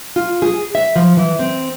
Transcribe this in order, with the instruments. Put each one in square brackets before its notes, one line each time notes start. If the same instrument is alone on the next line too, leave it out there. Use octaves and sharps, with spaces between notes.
[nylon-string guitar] F4
G#4
E5
F3
E3
C4